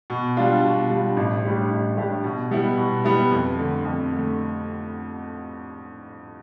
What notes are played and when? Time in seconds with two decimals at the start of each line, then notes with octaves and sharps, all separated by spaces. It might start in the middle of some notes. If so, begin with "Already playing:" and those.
0.10 B2
0.37 G3 D4 F4
0.64 B2
0.90 G3 D4 F4
1.17 A1
1.44 A2 G3 D4 G4
1.70 A1
1.97 A2 G3 D4 G4
2.24 B2
2.51 G3 B3 E4
2.77 B2
3.04 G3 B3 E4
3.31 F2
3.58 D3 A3
3.85 F2
4.13 D3 A3